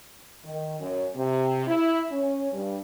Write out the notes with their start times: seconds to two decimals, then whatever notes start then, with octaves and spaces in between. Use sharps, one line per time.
0.44 D#3
0.79 F#2
1.16 C3
1.67 E4
2.11 C#4
2.52 G2